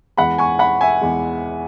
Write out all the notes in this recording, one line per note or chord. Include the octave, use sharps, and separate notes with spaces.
E2 E3 G#3 F#5 B5
G#5 C#6
F#5 B5
E5 G#5
E2 E3 G#3